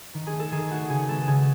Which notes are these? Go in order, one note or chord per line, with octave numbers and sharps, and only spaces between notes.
D#3
G#4
A3
A4
D#3 G#4
A3 F#4
C#3 G#4
G#3 B3 A4
C#3 G#4